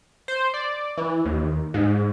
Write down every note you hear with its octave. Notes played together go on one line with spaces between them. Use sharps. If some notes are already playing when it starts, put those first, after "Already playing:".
C5
D5
E3
D#2
G#2